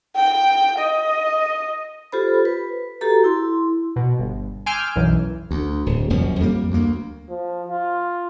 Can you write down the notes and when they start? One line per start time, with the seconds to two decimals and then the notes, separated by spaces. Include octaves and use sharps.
0.16 G5
0.79 D#5
2.12 F4 G4 A4 C5 B5
2.45 B4
3.01 F#4 G4 A4 A#5
3.24 E4 C6
3.96 B2
4.19 G1
4.66 G#5 C6 D6 E6 F6 G6
4.96 B1 F#2 E3
5.51 D2
5.86 D1
6.10 D#1 F#2 F3
6.40 F2 G3 A#3
6.71 D2 A#3
7.30 F3
7.69 F4